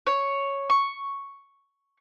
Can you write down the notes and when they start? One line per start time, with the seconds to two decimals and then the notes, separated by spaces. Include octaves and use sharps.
0.07 C#5
0.70 C#6